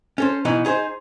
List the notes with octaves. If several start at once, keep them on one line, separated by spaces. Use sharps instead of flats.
C#4 A4 C5
B2 E3 B3 D#4
D#4 G#4 B4 C5